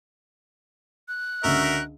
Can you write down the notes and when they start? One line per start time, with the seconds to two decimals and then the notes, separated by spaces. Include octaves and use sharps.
1.08 F#6
1.44 C#2 D3 F#4 A#4 E5